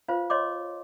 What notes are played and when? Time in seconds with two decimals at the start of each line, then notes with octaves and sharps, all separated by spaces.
0.08 F4 B4 C5 F5
0.30 C#5 D#5 C6 D6